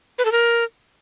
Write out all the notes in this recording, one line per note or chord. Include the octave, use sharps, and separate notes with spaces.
B4
A4
A#4